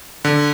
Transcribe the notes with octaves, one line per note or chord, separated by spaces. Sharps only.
D3